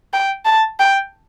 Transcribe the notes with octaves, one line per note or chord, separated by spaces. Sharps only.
G5
A5
G5